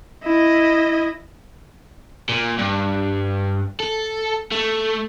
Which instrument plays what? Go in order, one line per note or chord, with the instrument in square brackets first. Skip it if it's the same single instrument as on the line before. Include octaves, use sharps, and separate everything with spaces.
[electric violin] E4 D#5
[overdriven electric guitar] A#2
G2
A4
A3